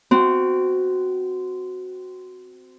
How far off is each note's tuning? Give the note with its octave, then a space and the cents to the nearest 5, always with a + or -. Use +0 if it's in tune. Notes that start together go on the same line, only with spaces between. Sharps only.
C4 -20 F#4 +0